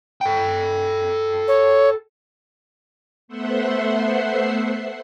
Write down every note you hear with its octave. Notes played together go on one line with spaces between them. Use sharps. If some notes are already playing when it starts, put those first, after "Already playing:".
A4 G5
C#5
A3 B3 C5 E5 F#5 C6